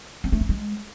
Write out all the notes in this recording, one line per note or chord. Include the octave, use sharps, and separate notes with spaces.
C4
A3
C4
G#3